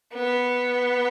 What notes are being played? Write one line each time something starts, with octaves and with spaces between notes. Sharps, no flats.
B3